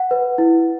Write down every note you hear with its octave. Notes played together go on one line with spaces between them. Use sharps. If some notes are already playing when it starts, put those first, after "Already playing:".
Already playing: F#5
B4
E4